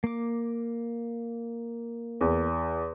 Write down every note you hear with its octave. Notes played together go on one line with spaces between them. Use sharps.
A#3 D6
E2